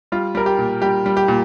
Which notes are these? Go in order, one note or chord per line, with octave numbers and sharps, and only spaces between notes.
G3 F4
G3 A#4
G4
A#2
G3 G4
G3
G4
A#2